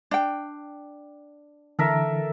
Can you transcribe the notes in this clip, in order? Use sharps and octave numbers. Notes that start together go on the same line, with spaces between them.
D4 G5
D3 E3 A4 A#4 E5